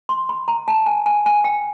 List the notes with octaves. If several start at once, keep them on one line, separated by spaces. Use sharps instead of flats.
C6
B5
A#5
A5
G#5
G#5
G#5
G5